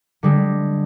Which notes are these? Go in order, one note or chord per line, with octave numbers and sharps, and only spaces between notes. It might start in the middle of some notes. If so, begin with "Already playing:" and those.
D3 G3 G#3